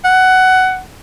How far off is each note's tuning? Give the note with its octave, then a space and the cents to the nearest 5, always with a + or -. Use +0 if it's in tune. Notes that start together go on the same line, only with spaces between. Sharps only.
F#5 +15